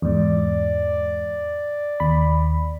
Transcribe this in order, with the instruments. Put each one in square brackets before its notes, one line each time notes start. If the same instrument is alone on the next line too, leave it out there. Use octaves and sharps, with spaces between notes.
[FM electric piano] E2 G#2 [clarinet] D5
[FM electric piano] D#2 B5